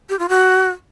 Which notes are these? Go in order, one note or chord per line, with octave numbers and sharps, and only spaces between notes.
G4
F4
F#4